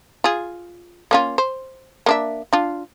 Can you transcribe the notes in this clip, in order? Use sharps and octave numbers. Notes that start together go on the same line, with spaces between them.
F4 G#4
A#3 C#4 F4
C5
A#3 D4 E5
D4 F4